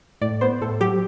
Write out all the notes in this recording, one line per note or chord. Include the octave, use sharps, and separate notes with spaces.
A2 D5
B3 C5
A2 A4
F#3 G4